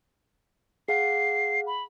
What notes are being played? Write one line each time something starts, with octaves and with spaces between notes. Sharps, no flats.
G#4 F5 F#5 C7
B5